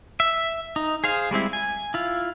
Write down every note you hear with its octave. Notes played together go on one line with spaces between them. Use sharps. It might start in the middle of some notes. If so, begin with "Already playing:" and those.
E5
D#4
G#4 C5 F5
G3 G#3 C4 E4
G#5
E4 F4